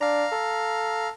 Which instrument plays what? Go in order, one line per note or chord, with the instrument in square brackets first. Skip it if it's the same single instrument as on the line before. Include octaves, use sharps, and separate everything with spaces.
[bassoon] D4 [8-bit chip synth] F5 A#5
[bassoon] A4